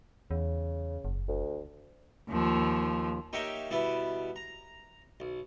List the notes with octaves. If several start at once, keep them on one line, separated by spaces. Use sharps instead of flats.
E2 C#3
F#1
D2
D#2 F3
A#3 D#4 G4 C#5 E5 G5
B2 G3 B3 E4
A#5
B1